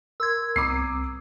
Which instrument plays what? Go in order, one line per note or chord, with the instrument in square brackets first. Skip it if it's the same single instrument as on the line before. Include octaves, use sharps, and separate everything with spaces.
[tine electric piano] A#4 C6 [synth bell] E6 G#6
[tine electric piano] C2 C4 A#5 [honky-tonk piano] D6 D#6 C7